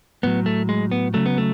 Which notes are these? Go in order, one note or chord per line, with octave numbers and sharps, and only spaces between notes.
A2 F#3 B3
A3
G#3
B3
C#3 F#3 A3
B3
A3